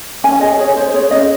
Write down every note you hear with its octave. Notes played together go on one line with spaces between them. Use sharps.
C#4 G#5
G#4 D#5
G#4 C#5
G#4 C5
G#4 C#5
C#4 D#5